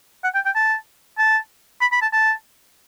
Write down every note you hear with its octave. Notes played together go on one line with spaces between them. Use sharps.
F#5
G5
G5
A5
A5
B5
B5
A5
A5